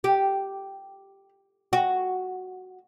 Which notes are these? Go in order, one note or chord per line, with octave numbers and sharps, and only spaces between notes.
G4
F#4